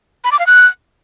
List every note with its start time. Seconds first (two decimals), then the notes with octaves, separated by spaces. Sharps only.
0.24 B5
0.32 D6
0.39 F5
0.47 F#6